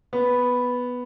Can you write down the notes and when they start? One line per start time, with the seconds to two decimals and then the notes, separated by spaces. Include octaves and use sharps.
0.13 B3